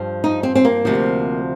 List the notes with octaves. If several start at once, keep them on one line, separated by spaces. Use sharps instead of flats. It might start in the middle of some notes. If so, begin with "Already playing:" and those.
Already playing: G2 F3
D#4
C4
C4
A#3
D2 C3 F3